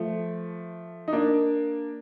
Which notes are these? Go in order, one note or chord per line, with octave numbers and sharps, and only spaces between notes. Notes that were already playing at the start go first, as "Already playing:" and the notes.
Already playing: F3 A3
D#4
A#3 D4